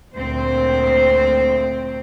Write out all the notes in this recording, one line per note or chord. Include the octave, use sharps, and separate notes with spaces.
D2 A#2 C4 C5